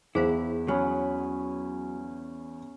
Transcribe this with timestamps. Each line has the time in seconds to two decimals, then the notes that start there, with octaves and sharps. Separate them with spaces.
0.15 E2 E4 G#4 C5 F5
0.68 F#3 C#4 B5 D#6